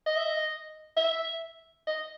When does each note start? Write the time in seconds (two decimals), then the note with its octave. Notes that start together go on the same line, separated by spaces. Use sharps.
0.06 D#5
0.17 E5
0.25 D#5
0.97 E5
1.87 D#5